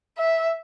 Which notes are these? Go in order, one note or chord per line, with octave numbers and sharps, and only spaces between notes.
E5